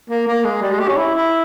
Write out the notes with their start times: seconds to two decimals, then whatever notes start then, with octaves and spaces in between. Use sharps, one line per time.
0.10 A#3
0.27 A#3
0.44 G#3
0.61 G3
0.71 G#3
0.79 G4
0.88 C#4
0.97 E4
1.14 E4